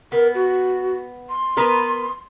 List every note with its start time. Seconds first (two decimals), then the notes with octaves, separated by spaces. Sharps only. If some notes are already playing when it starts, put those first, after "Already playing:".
0.12 B3 A#4
0.35 F#4
1.29 C6
1.57 B3 A#4 B4